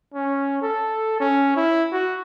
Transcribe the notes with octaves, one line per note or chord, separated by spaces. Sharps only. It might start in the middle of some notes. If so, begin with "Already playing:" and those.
C#4
A4
C#4
E4
F#4